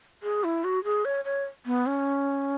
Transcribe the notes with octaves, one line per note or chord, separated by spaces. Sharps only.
G#4
E4
F#4
G#4
C#5
C#5
B3
C#4